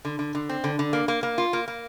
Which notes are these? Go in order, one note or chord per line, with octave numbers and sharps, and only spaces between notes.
D3
D3
D3
C4
D3
D3
A#3
A#3
A#3
F4
A#3
A#3